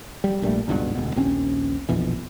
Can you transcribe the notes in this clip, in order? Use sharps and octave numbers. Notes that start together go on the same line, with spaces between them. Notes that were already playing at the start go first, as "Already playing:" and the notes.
G3
A#1 A#2 G3 A3
G#1 C#2 G2 B2
E1 D2 B2
A#1 D#2 C4 C#4
A#1 F2 B2 E3